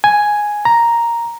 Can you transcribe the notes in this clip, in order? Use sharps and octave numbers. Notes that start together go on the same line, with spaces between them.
G#5
A#5